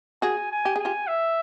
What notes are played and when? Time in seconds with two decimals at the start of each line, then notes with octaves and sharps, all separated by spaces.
0.22 F#4 G#4 G#5
0.51 G#5
0.65 G4
0.76 G#4 G#5
0.85 F4 G4
1.08 E5